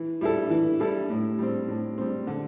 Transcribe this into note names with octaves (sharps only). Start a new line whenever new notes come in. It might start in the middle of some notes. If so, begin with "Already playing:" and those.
Already playing: E3
G3 E4 A4
E3
G3 E4 A4
A2
G3 C4
A2
G3 C4
D3